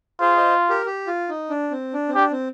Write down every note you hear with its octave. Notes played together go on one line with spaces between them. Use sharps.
F4 G#4 C5
C5 D#5
G4 A#4
G4
F4
D#4
D4
C4
D4
C4
D4 G4
C4